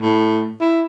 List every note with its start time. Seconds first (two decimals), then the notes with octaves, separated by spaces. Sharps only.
0.02 A2
0.61 E4